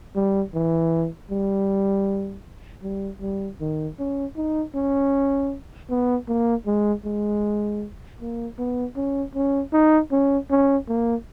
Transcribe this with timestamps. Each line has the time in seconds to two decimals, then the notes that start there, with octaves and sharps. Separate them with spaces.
0.16 G3
0.54 E3
1.31 G3
2.83 G3
3.21 G3
3.61 D#3
3.99 C#4
4.37 D#4
4.75 C#4
5.90 B3
6.28 A#3
6.66 G#3
7.05 G#3
8.21 A#3
8.59 B3
8.96 C#4
9.35 C#4
9.73 D#4
10.11 C#4
10.51 C#4
10.89 A#3